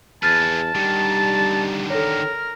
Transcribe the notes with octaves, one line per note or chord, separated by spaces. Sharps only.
E2 G#4 B4 A5 F6 A6
D3 D#3 G3
A4 A#4 C#5